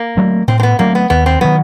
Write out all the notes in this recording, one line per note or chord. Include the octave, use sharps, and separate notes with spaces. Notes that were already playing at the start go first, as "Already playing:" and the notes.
Already playing: A#3
F#3 A3 C4
A2 C4
C4
B3
F#3 A3 A#3 C4
B3
D#2 B3
C4
D#3 F#3 B3